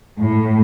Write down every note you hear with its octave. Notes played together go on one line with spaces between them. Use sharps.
A2